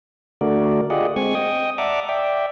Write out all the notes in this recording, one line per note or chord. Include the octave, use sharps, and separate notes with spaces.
D3 A3 F#4 A#4 D5
F4 G4 G#4 D5 D#5 F#5
G#3 C4 G#5 C#6
D#5 G5 D#6
D5 E5 F#5 A5 A#5 D6
D5 E5 G5